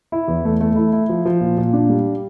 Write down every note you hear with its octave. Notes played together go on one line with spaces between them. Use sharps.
E4
E2
A3
A3
E4
E4
F3
F3
A#2
A#2
D4
G3